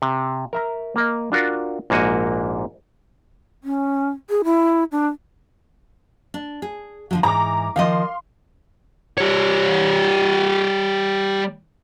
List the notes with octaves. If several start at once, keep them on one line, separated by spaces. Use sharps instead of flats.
C3
A#4 E5 A#5
A#3 A#4 D#5
D4 F4 F#4 A#4
A#1 G#2 A#3 F#4 G#5
C#4
G#4
E4
D4
D4
G#4
D3 F3 F#3
G#2 E3 A#5 D6
D#3 F3 D#5 F5 C6
G3 C#5